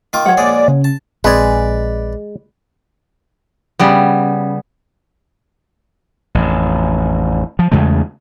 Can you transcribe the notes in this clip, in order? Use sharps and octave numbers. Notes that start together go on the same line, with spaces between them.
D#3 F4 D6
F#3 C#5 F#5
A#1 G#3 G#4 D5
C#3
A5
A#1 G#3 C4 B4 D5 G#5
C#3 G3 B3
A1 F2
F3
E2 C#3 G#3 A3